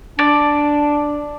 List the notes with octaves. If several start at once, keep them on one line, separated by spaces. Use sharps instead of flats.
D4 D5